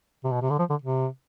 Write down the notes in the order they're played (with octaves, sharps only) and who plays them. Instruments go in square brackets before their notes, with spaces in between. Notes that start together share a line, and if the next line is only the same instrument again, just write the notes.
[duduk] C3
B2
C3
D3
F3
D3
C3